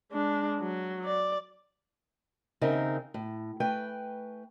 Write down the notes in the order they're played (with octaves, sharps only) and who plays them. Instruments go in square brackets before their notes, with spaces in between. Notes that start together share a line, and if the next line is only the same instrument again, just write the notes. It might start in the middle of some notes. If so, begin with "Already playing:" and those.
[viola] G#3 D4
F#3
D5
[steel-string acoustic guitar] D#2 C#3 C4 D#4 A#4 E5
A2
A3 B4 G5 G#5